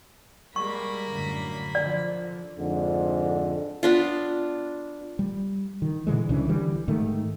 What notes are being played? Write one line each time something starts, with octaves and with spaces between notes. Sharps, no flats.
G3 G#3 A#3 B5 C#6
F#2 A2 D3
D3 F3 D5
F2 G#2 D3
B3 D4 F4
G3
D#3
A#2 D3 E3 G#3
C2 C#3 E3 D4
D3 E3 G3
G#2 D#3 A3